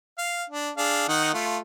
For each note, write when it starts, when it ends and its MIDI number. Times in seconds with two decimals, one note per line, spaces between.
0.18 0.44 77
0.50 0.71 62
0.77 1.07 62
0.77 1.07 68
0.77 1.07 77
1.08 1.31 51
1.08 1.31 63
1.08 1.31 78
1.34 1.58 57
1.34 1.58 65